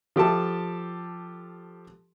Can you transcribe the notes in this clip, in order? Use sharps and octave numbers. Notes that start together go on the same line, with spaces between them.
F3 G4 A4 A5